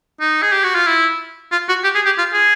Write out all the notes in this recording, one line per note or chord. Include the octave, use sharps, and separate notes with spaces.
D#4
G#4
G4
F#4
F4
E4
F4
F#4
G4
G#4
G4
F4
G#4